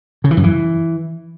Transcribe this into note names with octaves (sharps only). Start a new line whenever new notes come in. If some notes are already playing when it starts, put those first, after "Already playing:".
C#3
E3
F#2
E3